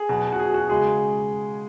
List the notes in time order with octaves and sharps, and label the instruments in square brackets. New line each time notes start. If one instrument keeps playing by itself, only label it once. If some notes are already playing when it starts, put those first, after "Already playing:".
Already playing: [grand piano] G#4
B2 F#3
F#4
G#4
F#4
C#3 G#3 G#4